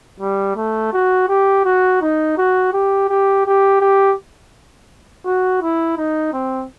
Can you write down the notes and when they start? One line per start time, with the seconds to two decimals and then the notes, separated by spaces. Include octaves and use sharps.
0.20 G3
0.56 A3
0.93 F#4
1.28 G4
1.65 F#4
2.01 D#4
2.38 F#4
2.73 G4
3.09 G4
3.46 G4
3.81 G4
5.25 F#4
5.62 E4
5.98 D#4
6.33 C4